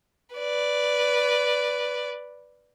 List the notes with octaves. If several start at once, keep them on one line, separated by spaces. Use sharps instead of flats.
B4 D5